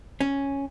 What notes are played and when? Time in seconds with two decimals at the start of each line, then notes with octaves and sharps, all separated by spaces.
0.21 C#4